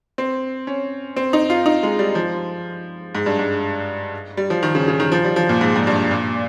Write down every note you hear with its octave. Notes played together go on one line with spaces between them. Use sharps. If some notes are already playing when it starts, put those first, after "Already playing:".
C4
C#4
C4
D#4
F4
D#4
G#3
G3
F3
G#2
G2
G#2
G3
F3
D#3
C#3
C#3
D#3
F3
G3
F3
A#2
G#2
G#2
G2
A#2